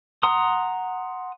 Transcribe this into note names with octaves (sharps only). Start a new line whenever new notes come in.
F#5 A#5 C6 D#6